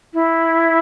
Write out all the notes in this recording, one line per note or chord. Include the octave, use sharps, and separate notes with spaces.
E4